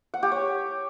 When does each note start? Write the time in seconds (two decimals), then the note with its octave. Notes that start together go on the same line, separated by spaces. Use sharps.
0.14 F#5
0.23 G4
0.32 C#5